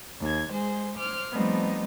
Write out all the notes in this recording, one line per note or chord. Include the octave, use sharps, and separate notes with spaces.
D#2 G#6
G#3 G#4 C5
C5 D6 F6
F3 G3 A3 B3 C4 D#4